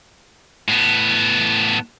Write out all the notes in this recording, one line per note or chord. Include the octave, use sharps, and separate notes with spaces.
A2 B3